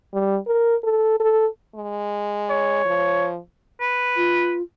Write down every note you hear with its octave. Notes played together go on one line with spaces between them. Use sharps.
G3
A#4
A4
A4
G#3
C#5
F3
B4
F4